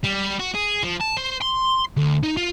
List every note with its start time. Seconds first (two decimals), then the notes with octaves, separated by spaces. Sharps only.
0.03 G3
0.39 F#4
0.54 G#4
0.83 F3
1.01 A5
1.17 C5
1.42 C6
1.97 D2
2.23 D#4
2.37 F4